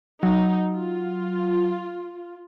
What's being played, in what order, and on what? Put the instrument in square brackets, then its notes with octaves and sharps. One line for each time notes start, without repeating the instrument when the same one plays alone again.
[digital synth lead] F#3 [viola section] D#4
[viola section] F4